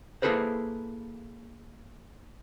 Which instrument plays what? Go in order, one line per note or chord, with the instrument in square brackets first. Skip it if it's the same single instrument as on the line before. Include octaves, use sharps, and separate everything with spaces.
[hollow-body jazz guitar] A#3 E4 G#4 A4 B4 C5